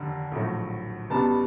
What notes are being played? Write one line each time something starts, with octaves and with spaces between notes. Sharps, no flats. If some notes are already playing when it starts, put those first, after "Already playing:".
Already playing: F1 D#2 D3
A#1 A2 F#3 A3
C#2 B2 G3 B3 D4 A5